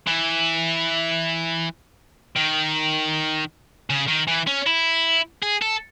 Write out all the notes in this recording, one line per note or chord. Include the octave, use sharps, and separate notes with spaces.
E3
D#3
C#3
D#3
E3
C#4
E4
G#4
A4